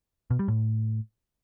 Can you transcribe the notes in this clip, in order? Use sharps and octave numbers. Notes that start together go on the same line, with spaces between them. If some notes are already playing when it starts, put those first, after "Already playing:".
B2
G3
A2